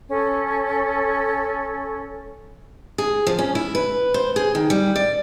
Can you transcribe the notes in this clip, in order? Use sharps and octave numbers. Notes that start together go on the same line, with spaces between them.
C#4 A4
G#4
F3
C#4
E4
B4
C5
G#4
D#3
G3
D5